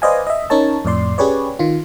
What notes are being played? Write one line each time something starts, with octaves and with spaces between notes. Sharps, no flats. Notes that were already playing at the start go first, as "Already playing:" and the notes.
B4 C5 D5 D#5 F5 G#5
D#5 E5
C#4 D#4 A#4 C#5 A5
F2 A2 D5 C6
C#4 G4 G#4 B4 C#5 D5
D#3 F4